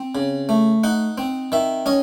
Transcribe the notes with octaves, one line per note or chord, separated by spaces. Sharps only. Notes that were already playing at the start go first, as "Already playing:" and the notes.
Already playing: C4
C#3
A3
D#4 F#5
C4
D#3 E5
C#4 D#5